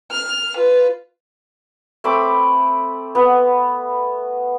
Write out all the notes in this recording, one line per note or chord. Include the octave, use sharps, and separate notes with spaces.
F6
F4 B4
A3 C4 B5 D6
B3 B4